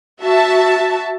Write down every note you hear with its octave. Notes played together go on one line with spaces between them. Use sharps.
F#4 E5 A5